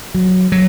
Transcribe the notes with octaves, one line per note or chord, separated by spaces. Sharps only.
F#3
F#3